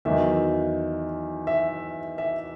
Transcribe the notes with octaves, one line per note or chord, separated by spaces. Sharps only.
E2 D#3 F#3 E5
E5
E5